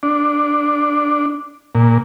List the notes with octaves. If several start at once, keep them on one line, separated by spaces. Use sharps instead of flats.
D4
A#2